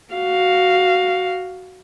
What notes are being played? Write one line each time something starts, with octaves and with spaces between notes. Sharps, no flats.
F#4 F5